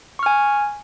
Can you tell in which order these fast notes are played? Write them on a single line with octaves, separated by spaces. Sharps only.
C#6 F6 G#5